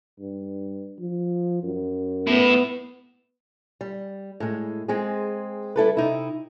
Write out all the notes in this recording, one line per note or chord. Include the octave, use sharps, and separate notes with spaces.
G2
F3
F#2
A2 B3 E4
G3
A2 G#3
G#3 C4 G#4
G3 E4 A4 B4
C3 D#4 E4